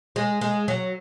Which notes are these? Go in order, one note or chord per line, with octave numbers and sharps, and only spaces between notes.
G#3
G#3
F#3